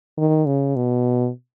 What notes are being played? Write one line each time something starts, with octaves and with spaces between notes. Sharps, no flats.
D#3
C#3
B2